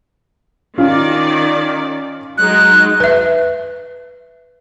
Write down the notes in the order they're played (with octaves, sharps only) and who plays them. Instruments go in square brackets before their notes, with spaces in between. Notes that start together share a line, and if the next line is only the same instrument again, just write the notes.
[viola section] D#3 D5 [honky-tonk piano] C#4 F4
[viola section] F#3 G#3 D#4 [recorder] F#6
[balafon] B4 E5